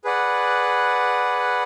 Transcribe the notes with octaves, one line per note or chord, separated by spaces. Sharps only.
G#4 B4 D5 F#5